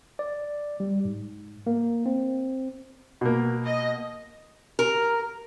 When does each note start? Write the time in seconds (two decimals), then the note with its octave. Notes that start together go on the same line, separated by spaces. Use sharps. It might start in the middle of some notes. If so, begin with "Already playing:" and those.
0.19 D5
0.80 G3
1.05 G#2
1.67 A#3
2.06 C4
3.21 B2 A#3
3.65 D#5
4.79 A#4